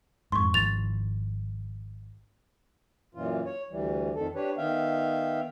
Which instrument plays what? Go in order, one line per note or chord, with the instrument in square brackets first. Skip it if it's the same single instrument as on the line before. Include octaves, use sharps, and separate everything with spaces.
[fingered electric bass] F2 G#2 [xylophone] C6 C#6
[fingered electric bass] G#1 F3 [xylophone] A6 F7
[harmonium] F#2 A#2 E3 F4
C#5
D2 E3 G3
F2 D#3 A4
D4 G4 B4 C#5
D#3 B3 E5 F5 G5